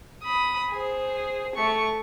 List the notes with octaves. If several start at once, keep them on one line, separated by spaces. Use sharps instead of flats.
B5 D#6
G#4 C5
A3 C#6